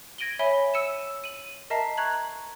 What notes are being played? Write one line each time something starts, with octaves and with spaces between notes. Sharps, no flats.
G#6 A#6 D7 D#7 F#7 G7
C#5 E5 G#5 B5 G7
E6 C#7 D#7 E7
D#7 F#7
A#4 D#5 E5 A5 A#5 C7
A#5 C#6 F#6 G#6 F#7